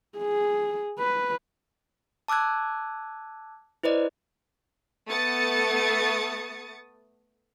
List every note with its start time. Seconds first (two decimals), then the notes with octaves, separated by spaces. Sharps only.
0.18 G#4
0.99 B4
2.28 A5 D6 E6 F#6 G#6
3.83 E4 B4 C5 D5 D#5
5.09 A3 B3 D#6 A6 C#7